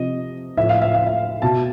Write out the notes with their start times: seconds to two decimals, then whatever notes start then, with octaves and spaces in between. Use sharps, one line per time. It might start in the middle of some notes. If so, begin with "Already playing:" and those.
Already playing: C3 F3 D#5
0.57 A2 F3 E5
0.69 F5
0.82 E5
0.94 F5
1.06 E5
1.42 B2 A5